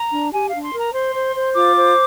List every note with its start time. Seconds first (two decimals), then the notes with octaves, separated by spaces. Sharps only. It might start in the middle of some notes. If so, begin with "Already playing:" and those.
Already playing: A#5
0.12 D4
0.33 G4 G#5
0.47 F5
0.53 D4
0.63 C6
0.73 A#4 A#5
0.93 C5 C6
1.15 C5
1.34 C5
1.55 F4 D6
1.75 C5